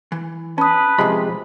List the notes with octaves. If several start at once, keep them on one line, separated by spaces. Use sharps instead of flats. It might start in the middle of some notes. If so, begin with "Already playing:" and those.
E3
C#4 B4 A5 D#6
C3 F3 G#3 F4 B5